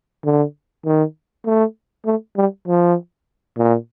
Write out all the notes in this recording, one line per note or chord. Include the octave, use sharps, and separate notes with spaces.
D3
D#3
A3
A3
G3
F3
A#2